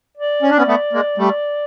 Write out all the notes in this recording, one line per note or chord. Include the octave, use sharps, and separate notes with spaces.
D5
C#4
D4
B3 C#4
A3 B3
G#3 A#3
G3 A3